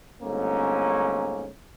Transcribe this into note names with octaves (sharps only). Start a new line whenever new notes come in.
G1 G#2 A3 A#3 C#4